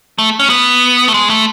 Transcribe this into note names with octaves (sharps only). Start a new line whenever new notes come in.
A3
C#4
B3
A3
G#3
A3